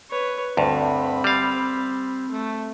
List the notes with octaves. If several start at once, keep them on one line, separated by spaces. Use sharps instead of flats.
B4 C#5
D2 G2 C4 B5
G3 F5
A3